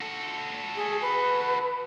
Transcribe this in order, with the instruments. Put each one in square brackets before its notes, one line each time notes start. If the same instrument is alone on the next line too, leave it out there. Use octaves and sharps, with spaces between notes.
[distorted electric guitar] F#4 A4
[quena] G#4
B4